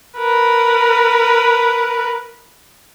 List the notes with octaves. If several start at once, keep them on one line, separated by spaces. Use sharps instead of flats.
A#4 B4